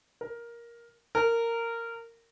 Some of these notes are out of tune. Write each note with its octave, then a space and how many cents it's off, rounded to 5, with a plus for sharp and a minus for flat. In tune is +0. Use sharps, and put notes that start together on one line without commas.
A#4 +10
A#4 -15